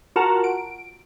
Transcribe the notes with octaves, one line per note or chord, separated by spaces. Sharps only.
F4 F#4 A#4 F#5 A5 A#5
D7